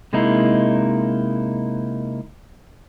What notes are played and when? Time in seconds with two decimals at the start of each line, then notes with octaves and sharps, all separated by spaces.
0.13 C3 G#3 A#3 D#4 E4